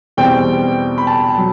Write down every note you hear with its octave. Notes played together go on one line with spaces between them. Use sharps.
E2 B2 G3 C4 G5
B5
A5
F#3